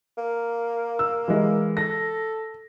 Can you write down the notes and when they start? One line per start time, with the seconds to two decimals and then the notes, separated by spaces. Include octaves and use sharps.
0.18 A#3
0.99 E6
1.28 E3 G#3
1.77 A4 A#6